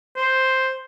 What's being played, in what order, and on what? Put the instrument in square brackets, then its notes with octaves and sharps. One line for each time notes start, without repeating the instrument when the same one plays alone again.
[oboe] C5